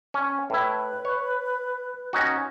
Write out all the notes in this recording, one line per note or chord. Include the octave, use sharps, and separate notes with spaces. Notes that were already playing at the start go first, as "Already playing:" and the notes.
C#4
A2 E4 B4
C#5
C#4 D#4 F#4